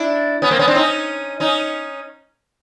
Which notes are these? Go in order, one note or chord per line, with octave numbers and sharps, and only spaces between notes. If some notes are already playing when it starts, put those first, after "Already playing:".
Already playing: D4 E4
B3 C#4
A#3 C4
B3 C#4
C4 D4
C#4 D#4
C#4 D#4